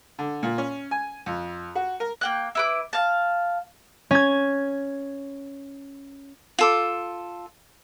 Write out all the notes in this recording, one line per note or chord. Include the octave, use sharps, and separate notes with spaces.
D3
A#2
C#4
G#5
F2
F#4
A#4
A#3 G5 F#6
E4 B4 D6
F5 A5
C#4 G#6
F4 A4 D6